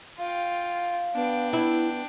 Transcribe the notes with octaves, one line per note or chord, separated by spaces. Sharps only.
F4 F5 G5
B3 D4 G5
E4